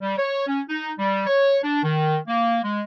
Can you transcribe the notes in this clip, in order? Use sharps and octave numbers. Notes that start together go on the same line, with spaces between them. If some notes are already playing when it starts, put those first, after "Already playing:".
G3
C#5
C#4
D#4
G3
C#5
D4
D#3
A#3
G#3